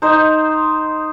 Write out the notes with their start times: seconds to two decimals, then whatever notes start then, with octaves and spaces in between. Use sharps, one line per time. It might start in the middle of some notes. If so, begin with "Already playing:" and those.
0.02 D#4 C5